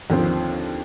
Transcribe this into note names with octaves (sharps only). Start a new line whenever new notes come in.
D#2 D3 F3 C4